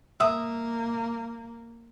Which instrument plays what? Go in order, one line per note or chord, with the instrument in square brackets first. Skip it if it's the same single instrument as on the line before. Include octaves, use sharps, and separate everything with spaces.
[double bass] A#3 [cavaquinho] E5 D#6